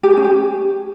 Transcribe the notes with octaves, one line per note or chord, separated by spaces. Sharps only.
G4
G#4
C#4
G4